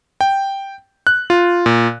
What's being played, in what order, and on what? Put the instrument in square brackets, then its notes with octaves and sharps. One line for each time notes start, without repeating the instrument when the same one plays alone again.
[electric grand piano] G5
F#6
F4
A#2